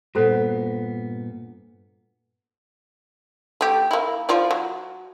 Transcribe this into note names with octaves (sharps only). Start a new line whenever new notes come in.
G2 A#2 B3 F#4 A4 C5
A3 G4
A#3 E4
F3 F4 D5
F#3